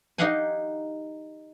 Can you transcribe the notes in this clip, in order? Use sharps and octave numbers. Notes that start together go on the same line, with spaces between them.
D#4 G4 D#5 F5 F#5 G#5